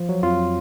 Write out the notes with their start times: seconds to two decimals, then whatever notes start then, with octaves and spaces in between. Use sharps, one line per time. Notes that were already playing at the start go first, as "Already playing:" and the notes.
Already playing: F3
0.09 F#3
0.23 F2 F4